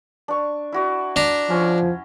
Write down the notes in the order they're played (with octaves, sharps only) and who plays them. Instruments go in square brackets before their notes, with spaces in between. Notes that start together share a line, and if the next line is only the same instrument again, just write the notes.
[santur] D4 C#6
E4 F#4 D5
[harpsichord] D4 A#5
[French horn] F3 [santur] C#4 C6